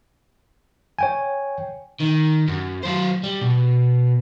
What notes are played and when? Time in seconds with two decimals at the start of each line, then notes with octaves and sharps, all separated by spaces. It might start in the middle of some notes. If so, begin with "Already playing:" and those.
0.99 C#5 G5 G#5
2.00 D#3
2.48 F#2
2.83 F#3 C5
3.24 G3
3.41 B2